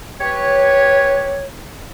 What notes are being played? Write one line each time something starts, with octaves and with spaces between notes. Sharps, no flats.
G4 B4 C#5